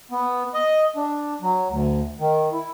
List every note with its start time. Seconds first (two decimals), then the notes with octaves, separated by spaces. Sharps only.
0.11 B3
0.54 D#5
0.96 D4
1.42 F#3
1.69 D2
2.19 D#3
2.53 E4